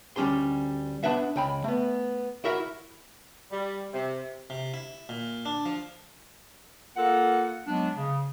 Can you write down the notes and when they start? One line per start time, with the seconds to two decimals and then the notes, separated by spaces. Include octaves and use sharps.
0.16 D2 G3 C#4 G4 C6
1.03 B3 D4 B4 E5 F#5
1.36 C#2 G5 B5
1.64 A3 B3
2.44 E4 F#4 A#4 E5 F#5
3.52 G3
3.94 C3
4.50 C3
4.74 E4
5.09 A#2
5.45 D4
5.66 F3
6.97 A#3 F4 A4 A#4 F#5
7.67 F#3 G#3 B3 D4
7.96 C#3